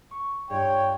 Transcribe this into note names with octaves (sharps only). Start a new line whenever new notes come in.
C#6
G2 F4 C#5 G5